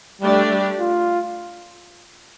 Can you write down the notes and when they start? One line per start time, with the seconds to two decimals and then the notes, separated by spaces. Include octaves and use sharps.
0.21 G3 A3 D4 G4 D5
0.50 G3
0.80 F4